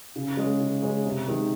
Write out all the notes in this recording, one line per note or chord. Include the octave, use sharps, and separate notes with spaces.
C#3
G#3 C#4 G#4
C#3
G#3 C#4 G#4
C3
D#3 G#3